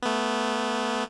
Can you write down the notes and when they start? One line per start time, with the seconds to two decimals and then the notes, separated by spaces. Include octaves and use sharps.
0.02 A3 B3